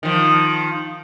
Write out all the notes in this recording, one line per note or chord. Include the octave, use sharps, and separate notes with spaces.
D#3 F3